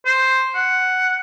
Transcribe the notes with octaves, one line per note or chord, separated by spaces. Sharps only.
C5
F#5